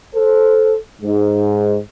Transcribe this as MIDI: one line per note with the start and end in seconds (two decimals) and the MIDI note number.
0.14 0.75 69
0.14 0.75 72
1.01 1.78 44